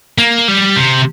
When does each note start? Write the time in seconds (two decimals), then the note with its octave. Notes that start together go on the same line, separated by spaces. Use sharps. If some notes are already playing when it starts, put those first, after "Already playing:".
0.18 A#3
0.48 G3
0.77 C3